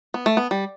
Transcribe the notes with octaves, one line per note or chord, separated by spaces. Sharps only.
B3
A3
B3
G3